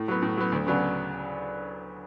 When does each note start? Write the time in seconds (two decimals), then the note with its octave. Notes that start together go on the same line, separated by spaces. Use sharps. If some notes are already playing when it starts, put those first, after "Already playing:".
Already playing: A2
0.08 F#3 B3
0.22 A2
0.37 F#3 B3
0.52 D2
0.66 C#3 F#3 B3 D4